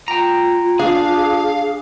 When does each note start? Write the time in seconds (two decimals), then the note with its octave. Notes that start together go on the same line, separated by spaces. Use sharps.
0.08 F4 G5 A#5
0.79 D4 G#4 F5